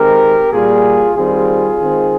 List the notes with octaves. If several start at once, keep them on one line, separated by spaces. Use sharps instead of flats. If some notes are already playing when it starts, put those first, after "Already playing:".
Already playing: D#3 G#3 C4 G4 A#4
A#2 G3 A#3 F4 G#4
D#3 G3 C4 F4 G#4
D#3 G#3 C4